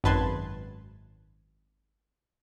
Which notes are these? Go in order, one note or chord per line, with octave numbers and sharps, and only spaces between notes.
G#1 F#2 B4 A5 C6 G#6